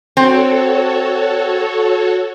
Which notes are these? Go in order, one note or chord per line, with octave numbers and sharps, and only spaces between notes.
C4 F#4 A4 C#5